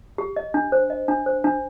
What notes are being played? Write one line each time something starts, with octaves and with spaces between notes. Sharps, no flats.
G4
D#5
D4
C5
D#5
D4
C5
D4